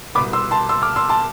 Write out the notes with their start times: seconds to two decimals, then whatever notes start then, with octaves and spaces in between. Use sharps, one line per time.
0.15 C2 B2 B3 B5 D6
0.33 C6 E6
0.51 A5 C6
0.69 C6 E6
0.82 D6 F6
0.96 C6 E6
1.09 A5 C6